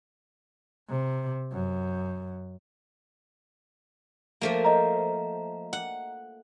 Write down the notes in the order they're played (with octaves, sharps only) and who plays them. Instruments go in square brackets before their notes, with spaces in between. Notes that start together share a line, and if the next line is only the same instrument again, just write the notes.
[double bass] C3
F#2
[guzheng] F3 A3 A#3
[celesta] D#5 A#5
[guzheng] F#5